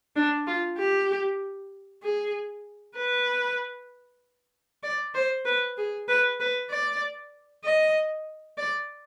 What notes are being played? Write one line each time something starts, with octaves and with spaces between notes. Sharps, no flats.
D4
F4
G4
G#4
B4
D5
C5
B4
G#4
B4
B4
D5
D#5
D5